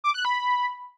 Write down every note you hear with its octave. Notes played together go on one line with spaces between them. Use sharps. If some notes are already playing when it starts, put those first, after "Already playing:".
D6
F#6
B5